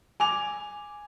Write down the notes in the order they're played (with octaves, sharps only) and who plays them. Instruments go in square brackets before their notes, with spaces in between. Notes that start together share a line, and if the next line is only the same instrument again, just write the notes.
[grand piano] G#5 D6 F7